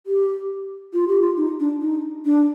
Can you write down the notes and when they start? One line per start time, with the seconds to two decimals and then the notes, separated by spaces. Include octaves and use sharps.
0.07 G4
0.93 F4
1.08 G4
1.22 F4
1.37 D#4
1.60 D4
1.81 D#4
2.25 D4